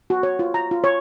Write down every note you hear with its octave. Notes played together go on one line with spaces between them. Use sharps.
F#4
C#5
F4
A#5
F4
C#5